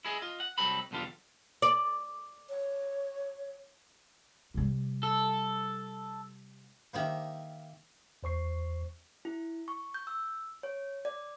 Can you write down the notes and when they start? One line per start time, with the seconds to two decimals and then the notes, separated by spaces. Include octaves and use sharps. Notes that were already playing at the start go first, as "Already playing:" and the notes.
0.05 E4 G#4 D#5
0.22 F4 D#5
0.40 F#5
0.58 C2 F#3 C4 D#4 A4 B5
0.91 B1 E2 D3 G3 F4
1.62 D5
2.50 C#5
4.54 C3 G3
5.03 A4
6.93 D#3 A#3 D#4 G4 C5 E5
8.23 E2 C5 C#6 C7
9.25 E4
9.68 C#6
9.94 G6
10.07 E6
10.63 C#5
11.05 D5